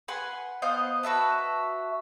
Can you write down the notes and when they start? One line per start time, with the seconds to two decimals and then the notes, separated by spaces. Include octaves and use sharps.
0.08 B4 F#5 G#5 C6
0.62 B3 C5 D#5 F5
1.03 F#4 B4 E5 A5